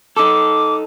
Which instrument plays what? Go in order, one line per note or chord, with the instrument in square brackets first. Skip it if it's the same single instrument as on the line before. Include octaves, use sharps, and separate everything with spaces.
[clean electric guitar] D#4 A4 [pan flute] D6